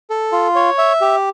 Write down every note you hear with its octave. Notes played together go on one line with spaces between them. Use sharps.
A4
F4
C#5
E5
G4